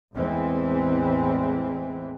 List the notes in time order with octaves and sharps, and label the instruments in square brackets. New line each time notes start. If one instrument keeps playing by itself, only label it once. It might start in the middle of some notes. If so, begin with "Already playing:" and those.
[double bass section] A1 E2 E3 G#3 C4